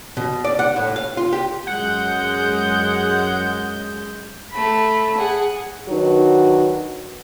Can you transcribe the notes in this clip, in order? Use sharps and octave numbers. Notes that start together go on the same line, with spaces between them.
B2
D5
F#5
A2
F5
F4
G4
F#2 G#3 F#5 G6
A3 B5
G#4 F#5
D#3 F#3 D4 D#4 F#4 B4